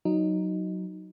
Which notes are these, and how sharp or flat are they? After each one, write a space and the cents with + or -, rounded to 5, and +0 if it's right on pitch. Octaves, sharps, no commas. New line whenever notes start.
F#3 +0 D#4 +0